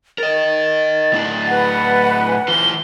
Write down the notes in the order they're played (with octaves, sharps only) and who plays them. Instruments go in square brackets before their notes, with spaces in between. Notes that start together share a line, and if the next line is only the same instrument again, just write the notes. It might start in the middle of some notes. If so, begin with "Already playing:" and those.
[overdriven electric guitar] A#4 D#5 [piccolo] A6
[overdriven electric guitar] A2 D4
[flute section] B4 F#5
[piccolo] G#5
[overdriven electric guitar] E3 F4 [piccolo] G7